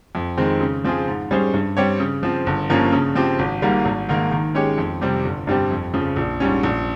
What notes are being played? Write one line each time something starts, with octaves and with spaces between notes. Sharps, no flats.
F2
D#3 G#3 C4
C#3
F3 C4 F4 G#4
G#2
G3 C#4 G#4 C5
G2
G3 C4 G4 C#5
C#3
F3 C4
G1
G2 F3 A#3 C#4
C#3
F3 C4 G4
G#1
G#2 G3 A#3
G#1
G#2 D#3 A#3
D#3
G#3 C#4 G4 C#5
F2
C3 G3 C4 G4
G1
G2 G3 C4 G4
F2
C#3 F3
A#1
G#2 G3 C#4
A#1